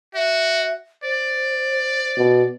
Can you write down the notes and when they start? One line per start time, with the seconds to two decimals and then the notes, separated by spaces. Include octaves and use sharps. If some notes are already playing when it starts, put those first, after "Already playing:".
0.15 F#4 E5
1.03 C5 D5
2.17 B2